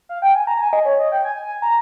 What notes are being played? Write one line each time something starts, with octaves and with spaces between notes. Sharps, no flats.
F5
G5
G#5
A#5
G#5
D#5
C#5
D#5
G5
G#5
G#5
A#5